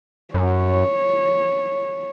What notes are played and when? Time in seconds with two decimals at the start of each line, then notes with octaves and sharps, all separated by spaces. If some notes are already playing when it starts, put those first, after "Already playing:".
0.34 F#2 C#5